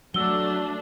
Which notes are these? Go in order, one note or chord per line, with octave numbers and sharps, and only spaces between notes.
F#3 A3 D4 E6 G7